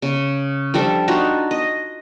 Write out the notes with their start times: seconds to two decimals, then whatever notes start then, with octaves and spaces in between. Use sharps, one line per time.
0.02 C#3
0.74 F3 G3 D4 A4
1.08 D4 D#4 F4 F#4
1.51 D#5